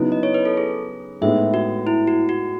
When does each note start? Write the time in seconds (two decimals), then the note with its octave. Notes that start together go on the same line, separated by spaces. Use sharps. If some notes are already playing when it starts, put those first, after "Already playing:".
Already playing: C#3 F#3 B3 D#4 E4
0.12 D#5
0.23 C#5
0.34 B4
0.45 A4
0.57 G#4
1.21 A2 G#3 B3 D#4 E5
1.54 F#4
1.87 E4
2.07 F#4
2.29 F#4